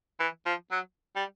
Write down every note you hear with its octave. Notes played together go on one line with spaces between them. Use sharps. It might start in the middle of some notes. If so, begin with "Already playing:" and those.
E3
F3
F#3
G3